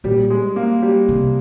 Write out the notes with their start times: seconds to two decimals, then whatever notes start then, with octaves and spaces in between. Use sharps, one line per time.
0.04 A#2 G3
0.30 G#3
0.56 A#3
0.82 G3
1.08 C3